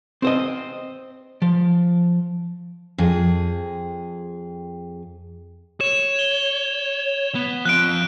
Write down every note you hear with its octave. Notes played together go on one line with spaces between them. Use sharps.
C4 C5 D#5
F3
F2 G#4
C#5 E7
G7
B3
F3 C4 F#6 D7